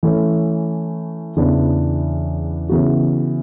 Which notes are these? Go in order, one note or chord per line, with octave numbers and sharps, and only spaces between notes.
E3 A3 C#4
E2 C#3 E3 B3 D4
C#3 E3 B3 F#4